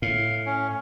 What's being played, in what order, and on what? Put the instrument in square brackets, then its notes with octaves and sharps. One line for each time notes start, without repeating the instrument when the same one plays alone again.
[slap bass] A2 [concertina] F5
[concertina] C#4